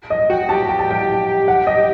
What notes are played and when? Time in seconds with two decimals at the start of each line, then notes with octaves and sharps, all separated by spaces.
0.10 D#5
0.30 F#4 G5
0.49 G4 A5
0.69 G5
0.79 A5
0.91 G5
1.48 F#5
1.67 D#5